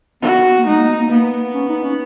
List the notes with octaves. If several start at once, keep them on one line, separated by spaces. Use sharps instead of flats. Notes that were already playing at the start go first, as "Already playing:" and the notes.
B3 F#4
A#3
G#3 D#4
A#3
B3
A#3
A#3 B3
C#4
D#4
C#4